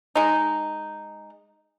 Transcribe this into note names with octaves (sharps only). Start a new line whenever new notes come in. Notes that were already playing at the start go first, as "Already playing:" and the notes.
G#3 D#4